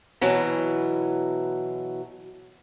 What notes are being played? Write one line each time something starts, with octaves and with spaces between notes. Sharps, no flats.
B2 E3 F#3